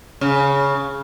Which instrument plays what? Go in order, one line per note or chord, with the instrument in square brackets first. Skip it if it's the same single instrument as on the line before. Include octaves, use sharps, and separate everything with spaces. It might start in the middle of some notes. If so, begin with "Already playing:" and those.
[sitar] C#3